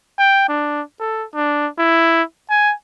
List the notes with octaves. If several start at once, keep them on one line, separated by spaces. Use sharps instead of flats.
G5
D4
A4
D4
E4
G#5